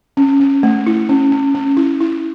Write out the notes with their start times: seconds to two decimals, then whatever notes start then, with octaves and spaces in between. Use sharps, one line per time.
0.17 C#4
0.40 C#4
0.63 A3
0.87 E4
1.09 C#4
1.32 C#4
1.55 C#4
1.77 E4
2.00 E4